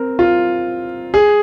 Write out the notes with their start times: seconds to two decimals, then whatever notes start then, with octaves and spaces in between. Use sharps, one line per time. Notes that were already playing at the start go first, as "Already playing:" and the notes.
Already playing: C4 A#4
0.19 F4
1.14 G#4